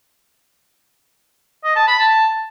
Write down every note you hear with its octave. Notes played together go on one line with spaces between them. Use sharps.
D#5
A5
B5
A5